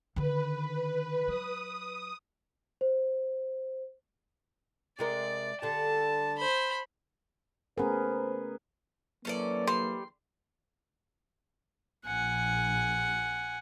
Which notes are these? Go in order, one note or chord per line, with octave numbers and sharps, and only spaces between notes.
D3 D#3 B4
F#3 D#6
C5
C3 G#3 A#4 D5
D3 G3 A5
C5 B5
A3 B3 C#4 G#4 A#4 C5
D3 E3 F#3 A#3 C#4 A4 D5
G3 C6
A#1 F#5 G#5